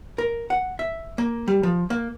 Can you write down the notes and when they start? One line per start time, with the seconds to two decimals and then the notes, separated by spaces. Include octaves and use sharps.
0.18 A#4
0.50 F#5
0.79 E5
1.18 A#3
1.48 G3
1.63 F3
1.90 A#3